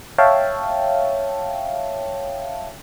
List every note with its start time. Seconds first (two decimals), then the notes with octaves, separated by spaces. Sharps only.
0.18 C#5 E5 F5 G5 A5